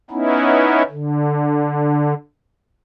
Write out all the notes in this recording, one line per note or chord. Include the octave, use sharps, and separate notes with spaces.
B3 C#4 D#4 E4
D3